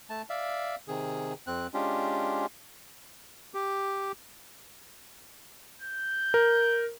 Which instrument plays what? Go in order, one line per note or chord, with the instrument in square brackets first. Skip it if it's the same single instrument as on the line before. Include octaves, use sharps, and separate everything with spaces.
[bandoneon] A3 A5
D5 E5 F5
C3 D#3 G#4
F2 C4 F#6
G#3 C#4 D4 F4 G4
[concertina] G4
[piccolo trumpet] G6
[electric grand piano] A#4